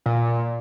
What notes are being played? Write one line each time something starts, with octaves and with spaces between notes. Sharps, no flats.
A#2